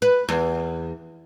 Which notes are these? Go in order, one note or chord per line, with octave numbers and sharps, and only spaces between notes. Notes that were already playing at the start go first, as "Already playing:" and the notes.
B4
E2